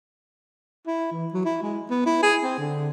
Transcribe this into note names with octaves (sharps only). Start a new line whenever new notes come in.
E4
E3
F#3
E4
G#3
B3
E4
G#4
C4
D3